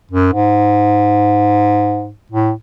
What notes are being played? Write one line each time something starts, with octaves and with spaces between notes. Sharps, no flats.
F#2
G#2
A2